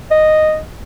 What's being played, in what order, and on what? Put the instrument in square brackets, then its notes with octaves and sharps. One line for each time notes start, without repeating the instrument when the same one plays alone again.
[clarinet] D#5